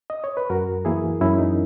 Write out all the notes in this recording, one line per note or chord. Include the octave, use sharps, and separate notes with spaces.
D#5
C#5
B4
F#2 F#4 A#4
E3 A#3 E4 G#4
F#2 C#4 E4
D#4